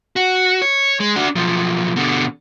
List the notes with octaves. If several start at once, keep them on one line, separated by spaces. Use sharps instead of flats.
F#4
C#5
G#3
D4 F#4
B1 F3
B2 D3